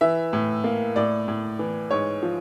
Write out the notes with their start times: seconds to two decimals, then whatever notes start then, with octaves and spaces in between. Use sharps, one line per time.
0.01 E3 E5
0.33 A2
0.64 A#3
0.96 A2 D5
1.28 A2
1.59 E3
1.91 G#2 C#5
2.23 F3